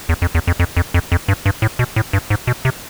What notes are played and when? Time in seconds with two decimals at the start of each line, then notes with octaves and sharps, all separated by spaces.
0.09 E2
0.22 F2
0.35 E2
0.47 F2
0.60 F2
0.77 F2
0.94 F2
1.12 F2
1.28 G2
1.46 G2
1.62 A2
1.79 B2
1.96 A2
2.13 G2
2.30 G#2
2.47 B2
2.65 C3